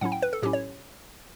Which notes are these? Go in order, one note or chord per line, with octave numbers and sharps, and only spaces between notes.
A2 F#3 C#4 E4 F#5
G5
B4
A4
A2 F#3 C#4 E4 G4
C#5